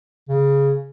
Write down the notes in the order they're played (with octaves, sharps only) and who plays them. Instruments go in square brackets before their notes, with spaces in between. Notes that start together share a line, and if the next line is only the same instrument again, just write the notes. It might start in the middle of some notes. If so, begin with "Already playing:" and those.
[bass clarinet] C#3